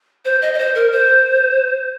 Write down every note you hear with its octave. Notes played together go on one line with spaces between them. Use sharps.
C5
D#5
D#5
C5
A#4
C5